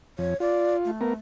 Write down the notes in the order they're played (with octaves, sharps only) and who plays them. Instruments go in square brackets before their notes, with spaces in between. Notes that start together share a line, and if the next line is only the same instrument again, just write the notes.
[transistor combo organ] F2 [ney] C#5
[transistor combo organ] F4 [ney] D5
[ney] A3
[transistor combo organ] B3 A#4